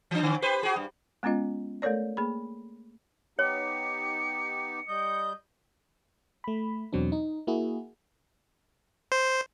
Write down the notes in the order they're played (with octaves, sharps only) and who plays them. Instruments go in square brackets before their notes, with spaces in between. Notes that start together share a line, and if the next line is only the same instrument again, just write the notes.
[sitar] E3 D4
D3 C#4
G4 B4 C5
F#4 G#4
G2
[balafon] G#3 B3 C#4 F4 D#5
A3 A4 A#4 C#5 D5
A#3 G#4 B5
[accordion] B3 D#4 G4 [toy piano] C#5 [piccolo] C#7
[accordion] G3 G6 [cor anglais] D#5
[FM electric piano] A3 B5
E2 B2 F#3 C4 D4
D#4
A#3 E4 F#4 G#4
[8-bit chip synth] C5